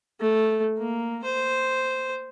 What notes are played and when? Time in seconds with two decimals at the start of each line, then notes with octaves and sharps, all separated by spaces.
0.20 A3
0.78 A#3
1.24 C5